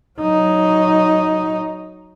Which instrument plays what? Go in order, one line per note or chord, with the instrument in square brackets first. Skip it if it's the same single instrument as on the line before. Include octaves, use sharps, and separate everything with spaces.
[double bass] F#3 D#4